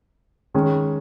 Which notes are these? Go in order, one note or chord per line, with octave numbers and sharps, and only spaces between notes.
D#3 G#3 C#4